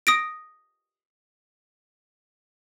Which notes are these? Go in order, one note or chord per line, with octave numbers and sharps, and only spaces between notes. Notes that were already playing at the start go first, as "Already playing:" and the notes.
D#6 A#6 D7